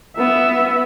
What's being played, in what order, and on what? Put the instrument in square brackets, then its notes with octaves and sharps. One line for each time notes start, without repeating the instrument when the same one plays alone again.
[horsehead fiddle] B3 E5